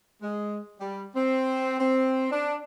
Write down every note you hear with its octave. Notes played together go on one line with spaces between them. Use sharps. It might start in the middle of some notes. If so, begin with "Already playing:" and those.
G#3
G3
C4
C4
D4